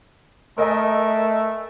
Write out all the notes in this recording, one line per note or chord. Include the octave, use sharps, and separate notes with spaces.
A3 A#4 D#5 G#5